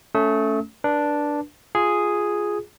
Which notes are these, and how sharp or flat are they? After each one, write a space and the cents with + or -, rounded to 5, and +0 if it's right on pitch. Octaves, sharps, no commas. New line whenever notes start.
A3 +0 C#4 +15 D#6 +45
D4 +0 B4 -35
F4 +0 G#4 +0